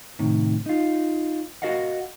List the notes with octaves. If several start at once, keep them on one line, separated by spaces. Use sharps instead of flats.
A2 C3 D#3
D#4 F4
F#4 A#4 D#5 F5 F#5